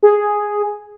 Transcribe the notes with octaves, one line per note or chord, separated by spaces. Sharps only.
G#4